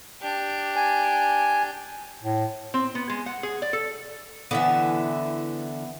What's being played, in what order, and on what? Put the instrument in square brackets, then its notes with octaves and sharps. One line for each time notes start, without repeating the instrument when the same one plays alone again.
[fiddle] D4 G4
[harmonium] G#5
[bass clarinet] A2
[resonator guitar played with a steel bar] C4
B3
G#3
F#5
G#4
D5
A4
[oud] D3 E3 [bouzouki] B3 E5